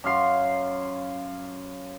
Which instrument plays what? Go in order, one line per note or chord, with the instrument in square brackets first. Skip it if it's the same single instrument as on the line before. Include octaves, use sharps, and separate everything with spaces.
[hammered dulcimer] F#2 F5 C6